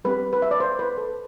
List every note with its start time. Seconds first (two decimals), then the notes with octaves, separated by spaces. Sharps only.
0.04 G3 C4 G4 B4
0.33 B4
0.42 E5
0.51 D5
0.60 C5
0.79 B4
0.98 A4